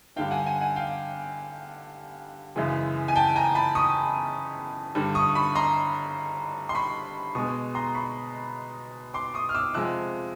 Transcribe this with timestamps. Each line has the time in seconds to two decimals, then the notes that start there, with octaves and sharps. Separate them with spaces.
0.16 G2 D3 G3 F5 G5
0.31 F#5 G#5
0.46 F#5 G#5
0.61 F#5 G#5
0.76 F5 G5
2.56 F#2 C#3 E3 G#3
3.08 G#5
3.16 G5 A5
3.36 G#5 A#5
3.55 A5 B5
3.75 C#6 D#6
4.95 G2 D3 G3
5.15 C#6 D#6
5.35 B5 C#6
5.55 A#5 C6
6.69 C6
6.75 B5 C#6
7.35 B2 G#3 C#6 D#6
7.75 A#5 C6
7.95 B5 C#6
9.14 C6 D6
9.34 C#6 D#6
9.49 F6
9.55 D6 E6
9.74 F2 C3 F3 G#3 E6 F#6